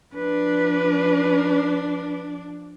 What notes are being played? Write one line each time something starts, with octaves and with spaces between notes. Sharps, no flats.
F3 D4 B4